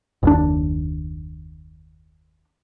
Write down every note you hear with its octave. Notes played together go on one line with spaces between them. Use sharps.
F#1 D#2 D4